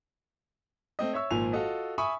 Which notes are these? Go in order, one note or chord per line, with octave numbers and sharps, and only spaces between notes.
A3 C4 D#5
C#5 E5 C#6 E6
G#1 A#2 F3 G#5 F7
F4 F#4 A4 D#5
E5 G#5 B5 C#6 D#6